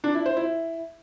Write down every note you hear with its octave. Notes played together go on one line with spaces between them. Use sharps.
D4
E4
C5
E4